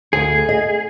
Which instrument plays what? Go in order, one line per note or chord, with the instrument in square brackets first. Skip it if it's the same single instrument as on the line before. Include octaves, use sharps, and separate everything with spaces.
[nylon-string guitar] D2 [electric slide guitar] G#4
[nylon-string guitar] D#5